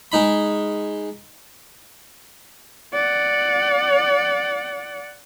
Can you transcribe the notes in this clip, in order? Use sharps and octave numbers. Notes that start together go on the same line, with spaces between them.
G#3 D#4 B5
D5 F#5